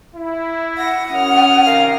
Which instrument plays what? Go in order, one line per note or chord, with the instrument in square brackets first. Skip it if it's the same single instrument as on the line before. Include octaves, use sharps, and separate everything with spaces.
[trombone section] E4
[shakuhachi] F#5 [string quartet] A#6
[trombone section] F#2 [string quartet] C#4 D#6 F6
[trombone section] C3 D#3 A#4 [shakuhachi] F5